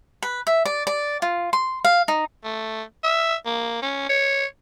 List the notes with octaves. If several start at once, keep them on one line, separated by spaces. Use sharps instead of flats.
B4
E5
D5
D5
F4
C6
F5
D#4
A3
E5
A#3
C#4
C#5